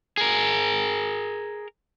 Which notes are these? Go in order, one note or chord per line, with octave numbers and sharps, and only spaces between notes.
G#4 A#4